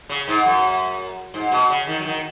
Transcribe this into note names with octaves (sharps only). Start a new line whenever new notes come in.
C#3
G#2
F#2
G#2
B2
C#3
D#3
F#3
D#3